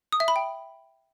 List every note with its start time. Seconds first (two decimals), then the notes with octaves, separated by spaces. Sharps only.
0.12 D#6
0.20 E5
0.28 B5
0.36 G5